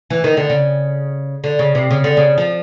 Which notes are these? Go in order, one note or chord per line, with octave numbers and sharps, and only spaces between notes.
E3
D#3
D3
C#3
D3
C#3
C3
C#3
D3
C#3
F3